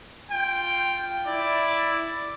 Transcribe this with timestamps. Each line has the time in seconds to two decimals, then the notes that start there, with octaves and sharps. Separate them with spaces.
0.32 F4 G5
1.28 E4 D5